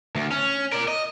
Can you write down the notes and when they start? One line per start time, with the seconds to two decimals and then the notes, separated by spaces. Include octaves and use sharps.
0.15 D2
0.31 C#4
0.72 A#4 D5
0.88 D#5